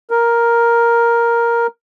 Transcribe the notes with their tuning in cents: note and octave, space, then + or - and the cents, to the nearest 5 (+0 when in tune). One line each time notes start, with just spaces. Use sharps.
A#4 +5